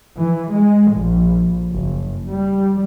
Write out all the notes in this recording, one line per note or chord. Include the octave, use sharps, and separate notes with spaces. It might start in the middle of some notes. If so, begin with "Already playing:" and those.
E3
G#3
A#1
F#1
G3